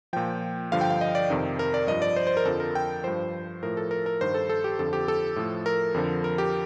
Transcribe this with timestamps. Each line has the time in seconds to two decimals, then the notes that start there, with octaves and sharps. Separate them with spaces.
0.13 A#2 F3 G5
0.72 G2 D3 F3 F5
0.81 G5
0.90 F5
1.01 D#5
1.15 D5
1.30 F2 C3 D#3
1.59 A#4
1.74 D5
1.87 G2 F3 D#5
2.02 D5
2.16 C5
2.27 C5
2.37 A#4
2.45 F2 D3 F3 A4
2.60 A#4
2.75 G5
3.04 G2 F3 C5
3.62 A2 F3 A#4
3.77 A4
3.91 A#4
4.06 A#4
4.21 G2 D#3 C5
4.34 A4
4.49 A4
4.64 G4
4.79 F2 D3 F3 A4
4.93 G4
5.08 A4
5.36 A2 F3
5.66 A#4
5.94 F2 D3 F3
6.24 A#4
6.38 G4